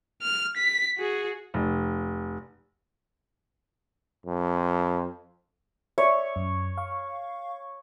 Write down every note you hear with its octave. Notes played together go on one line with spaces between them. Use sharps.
F6
B6
F#4 G#4
F1
F2
C#5 D5 E5
F#2
F5 C#6